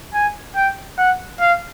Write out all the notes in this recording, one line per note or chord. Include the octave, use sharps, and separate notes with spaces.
G#5
G5
F#5
F5